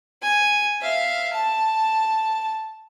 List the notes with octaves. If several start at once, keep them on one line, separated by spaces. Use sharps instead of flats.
G#5
E5 F5
A5